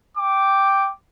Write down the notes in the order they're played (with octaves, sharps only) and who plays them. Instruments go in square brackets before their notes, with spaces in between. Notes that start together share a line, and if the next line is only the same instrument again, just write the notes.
[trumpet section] G5 D6